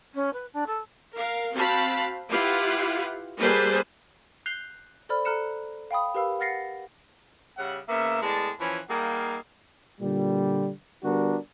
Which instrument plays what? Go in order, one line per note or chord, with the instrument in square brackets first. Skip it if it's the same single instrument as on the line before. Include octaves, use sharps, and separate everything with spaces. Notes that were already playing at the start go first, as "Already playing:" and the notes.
[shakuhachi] C#4
B4
D4
A4
[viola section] A#4 F5
C4 F#4 F5 A5 B5
E4 F4 G4 B4 F5 F#5
G3 A#3 G#4 B4 C5 A5
[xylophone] F#6 G6 C7 F7 G7
A4 C5 D5 B5 F6
A4 A#5 F6 F#6 C#7 E7
F5 G5 B5 D#6
G4 A#4 B4 F5 B5 E6
F#5 F6 A6 A#6 C7 C#7
[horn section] C#3 G3 C#4 E5 F#5
C#3 A#3 B3 E5
A2 G#3 B3 D5 A5
E3 F3 C#4 G#5 B5
G3 A#3 D#4 G#4 F5 F#5
[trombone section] A#2 D3 G3
D3 G3 B3 D4 F#4 A#4